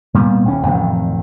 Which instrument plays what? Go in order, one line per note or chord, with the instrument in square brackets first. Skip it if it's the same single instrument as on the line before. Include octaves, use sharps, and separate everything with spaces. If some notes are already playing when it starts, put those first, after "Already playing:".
[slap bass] A#2 G3 G#3 B3
D#1 C2 C#4
A1 F2 C3 D#3